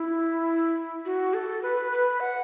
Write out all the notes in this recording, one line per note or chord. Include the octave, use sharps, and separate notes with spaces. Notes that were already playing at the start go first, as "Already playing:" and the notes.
Already playing: E4
F#4
A4
B4
B4
F#5